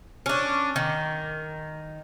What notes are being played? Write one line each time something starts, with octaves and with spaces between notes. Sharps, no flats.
C#4 D4
D#3